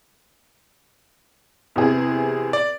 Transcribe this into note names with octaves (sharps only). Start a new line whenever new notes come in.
E2 C3 G#4
D5